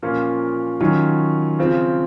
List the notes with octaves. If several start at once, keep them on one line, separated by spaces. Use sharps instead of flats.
A#2 F3 A#3 C#4 F4
D#3 F#3 C#4 F4
C#3 F3 C4 F4